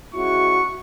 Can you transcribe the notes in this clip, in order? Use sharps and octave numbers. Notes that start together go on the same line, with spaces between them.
G#3 C#4 E4 F#4 C#6